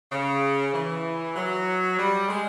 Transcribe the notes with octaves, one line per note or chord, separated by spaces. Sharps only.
C#3
E3
F#3
G3
G#3